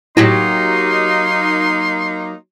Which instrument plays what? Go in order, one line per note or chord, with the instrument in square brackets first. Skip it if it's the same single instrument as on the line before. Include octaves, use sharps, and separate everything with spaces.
[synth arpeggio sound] A2 [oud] F#3 F#4 G4 [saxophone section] A#3 D#4 [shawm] C6